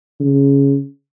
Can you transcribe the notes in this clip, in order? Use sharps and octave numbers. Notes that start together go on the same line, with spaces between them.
C#3